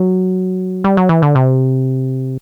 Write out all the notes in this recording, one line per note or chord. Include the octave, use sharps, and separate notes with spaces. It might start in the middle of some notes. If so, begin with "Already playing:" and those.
Already playing: F#3
G3
F#3
E3
D3
C3